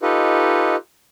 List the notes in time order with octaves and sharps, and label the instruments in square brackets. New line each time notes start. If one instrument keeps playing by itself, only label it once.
[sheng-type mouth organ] D#4 F4 G4 A4 B4 D#5